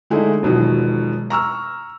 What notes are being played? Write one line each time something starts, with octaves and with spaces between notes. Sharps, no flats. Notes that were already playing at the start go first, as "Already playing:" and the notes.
D3 G#3 A3 D#4 E4
E1 B2 D#3 F3 F#3
A#5 C#6 E6 F6